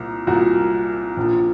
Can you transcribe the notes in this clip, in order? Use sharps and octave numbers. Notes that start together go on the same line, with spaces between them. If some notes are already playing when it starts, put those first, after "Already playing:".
Already playing: C2 A#2
C2 A#2 F#4
A#1 A#2